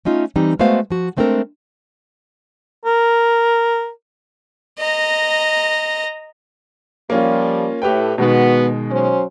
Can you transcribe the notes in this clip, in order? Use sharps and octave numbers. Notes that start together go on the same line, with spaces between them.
A3 C#4 D#4 F4
E3 G3 C4 D#4
G#3 A3 B3 F#4 C5 F5
F3 F#4
G#3 A3 C4 D4 A4 A#4
A#4
D#5 A#5
F3 G3 A#3 C#4 F4
A2 G4 B4 G5
B2 D#3 G#3 B3 F#4
F#3 C#4 C5